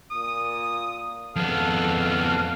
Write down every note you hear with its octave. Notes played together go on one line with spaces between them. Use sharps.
A#2 D#6
F2 B3 A4 F5